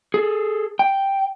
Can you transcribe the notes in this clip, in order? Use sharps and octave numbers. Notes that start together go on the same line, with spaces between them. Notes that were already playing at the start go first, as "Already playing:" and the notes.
G#4 A4
G5